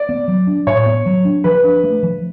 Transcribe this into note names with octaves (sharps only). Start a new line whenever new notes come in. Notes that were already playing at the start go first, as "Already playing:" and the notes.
Already playing: D5
B3
F#3
D4
A2 C#5
B3
F#3
D4
F3 B4
D4
A3
F3